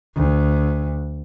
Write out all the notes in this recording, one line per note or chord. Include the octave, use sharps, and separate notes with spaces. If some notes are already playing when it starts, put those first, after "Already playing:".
D2